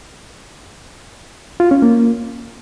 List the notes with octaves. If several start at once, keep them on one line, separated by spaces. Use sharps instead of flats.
F4
C#4
A#3